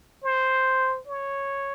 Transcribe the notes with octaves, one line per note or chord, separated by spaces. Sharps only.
C5
C#5